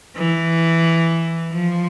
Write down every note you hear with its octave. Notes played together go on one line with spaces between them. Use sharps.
E3
F3